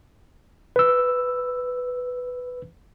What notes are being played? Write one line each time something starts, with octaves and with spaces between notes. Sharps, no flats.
B4 E6